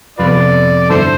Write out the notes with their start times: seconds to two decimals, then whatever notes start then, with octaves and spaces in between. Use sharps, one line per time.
0.19 F2 C3 F3 B3 F4 B4 D5
0.89 G2 D3 A3 E4 A4 C5